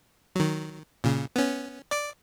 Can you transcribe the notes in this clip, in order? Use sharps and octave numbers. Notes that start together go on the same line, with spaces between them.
D#3 F#3
A#2 C#3
B3 C#4
D5 D6